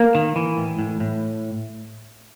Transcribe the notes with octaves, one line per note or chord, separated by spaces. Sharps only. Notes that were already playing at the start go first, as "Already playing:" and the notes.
Already playing: A#3
D#3
E3
A2
A2
A2